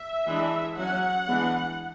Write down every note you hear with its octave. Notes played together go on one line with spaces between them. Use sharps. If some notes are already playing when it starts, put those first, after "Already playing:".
Already playing: E5
E3 G#3 D4
F#3 C#4 F#5
E3 G#3 B3 D4